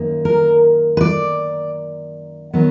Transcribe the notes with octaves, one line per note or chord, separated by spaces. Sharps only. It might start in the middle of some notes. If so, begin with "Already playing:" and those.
Already playing: F#2 D#3 A#3
A#4
B4
D5
D#3 F#3 B3